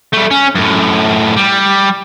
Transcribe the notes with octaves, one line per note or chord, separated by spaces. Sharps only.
G3 A3
C#4
F#2 A2
G3